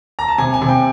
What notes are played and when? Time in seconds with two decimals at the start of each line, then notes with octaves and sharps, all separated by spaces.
0.19 A#5
0.28 A5
0.38 C3 G#5
0.54 G#5
0.62 C3
0.69 G5